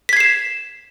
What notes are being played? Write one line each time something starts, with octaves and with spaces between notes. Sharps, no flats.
G#6 B6 C7 E7